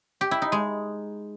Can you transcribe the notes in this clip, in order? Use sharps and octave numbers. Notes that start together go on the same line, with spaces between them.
G4
E4
D#4
G#3